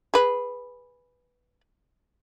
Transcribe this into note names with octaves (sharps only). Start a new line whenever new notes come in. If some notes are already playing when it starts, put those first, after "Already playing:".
G#4 B4